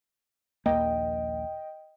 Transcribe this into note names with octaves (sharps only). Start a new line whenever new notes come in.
A#1 D#2 A#3 D#5 G5